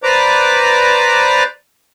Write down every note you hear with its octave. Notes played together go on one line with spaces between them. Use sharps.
B4 C5 D5 A#5 D6